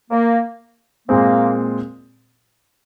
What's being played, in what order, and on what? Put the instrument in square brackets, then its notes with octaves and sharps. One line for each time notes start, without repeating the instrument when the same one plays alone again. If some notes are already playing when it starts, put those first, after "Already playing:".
[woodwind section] A#3
[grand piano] A#2 G#3 C4 [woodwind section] A#3